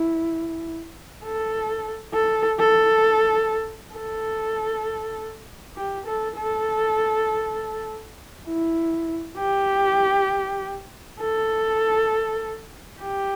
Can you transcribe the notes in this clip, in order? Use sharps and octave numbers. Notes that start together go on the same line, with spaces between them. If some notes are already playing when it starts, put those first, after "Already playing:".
Already playing: E4
A4
A4
A4
A4
G4
A4
A4
E4
G4
A4
G4